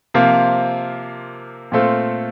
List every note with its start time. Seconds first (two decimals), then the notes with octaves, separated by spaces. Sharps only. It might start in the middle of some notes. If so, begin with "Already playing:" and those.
0.14 C3 F3 A#3 F4
1.72 A#2 A3 C4 F4 A4